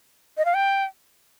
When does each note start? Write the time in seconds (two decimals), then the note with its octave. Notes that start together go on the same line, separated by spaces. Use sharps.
0.38 D#5
0.45 F5
0.54 G5